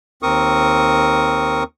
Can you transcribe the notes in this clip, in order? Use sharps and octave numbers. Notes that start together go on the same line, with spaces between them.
D#2 C4 A#4 C#6 D#6